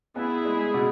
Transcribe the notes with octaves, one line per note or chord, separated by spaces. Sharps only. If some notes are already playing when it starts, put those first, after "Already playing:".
B3 E4 G#4
G#3
B2